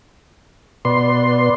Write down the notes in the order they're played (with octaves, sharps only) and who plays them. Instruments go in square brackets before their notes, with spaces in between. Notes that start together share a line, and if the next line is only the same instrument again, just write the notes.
[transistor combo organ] B2 C6 [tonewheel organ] B4 D5